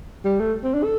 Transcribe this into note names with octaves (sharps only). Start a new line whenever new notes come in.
G3
A3
C4
D4
A4